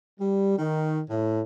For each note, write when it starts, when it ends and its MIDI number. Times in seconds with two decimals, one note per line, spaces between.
0.20 0.56 55
0.58 1.01 51
1.10 1.42 45